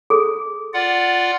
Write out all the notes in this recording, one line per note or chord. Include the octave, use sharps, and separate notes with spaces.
G#4 A4
F4 D5 F#5